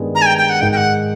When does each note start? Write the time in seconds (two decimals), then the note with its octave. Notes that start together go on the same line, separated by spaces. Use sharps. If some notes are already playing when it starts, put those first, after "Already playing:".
Already playing: G2 D#3 G#3 B3
0.15 A#5
0.22 G#5
0.26 G5
0.38 G5
0.50 F#5
0.61 G#2 D#3 G#3 G5
0.72 G5
0.77 F#5